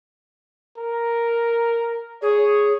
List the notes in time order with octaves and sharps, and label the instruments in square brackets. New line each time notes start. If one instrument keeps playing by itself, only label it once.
[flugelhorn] A#4
[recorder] G#4 [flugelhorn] C#5